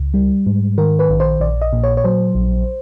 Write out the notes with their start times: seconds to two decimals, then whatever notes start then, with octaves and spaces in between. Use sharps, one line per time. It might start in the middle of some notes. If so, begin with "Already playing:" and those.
Already playing: C#2
0.14 G3
0.47 G#2
0.78 D#3 A#4
0.99 B4
1.10 A#1
1.20 C5
1.40 A#1 D5
1.62 D#5
1.73 A#2
1.84 C#5
1.97 C#5
2.04 F#3 C5
2.35 A#1